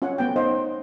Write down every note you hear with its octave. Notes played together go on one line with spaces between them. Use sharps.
C#4 F4 C#5 F#5 G#5
A3 B3 G5
D#4 C5 D#5 F5